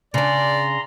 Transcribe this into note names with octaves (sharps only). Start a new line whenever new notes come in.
C#3 D4 D5 A#5 C6